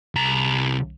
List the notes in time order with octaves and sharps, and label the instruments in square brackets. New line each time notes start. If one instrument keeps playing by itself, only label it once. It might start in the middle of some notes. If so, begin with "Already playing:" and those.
[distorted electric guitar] C2 A#5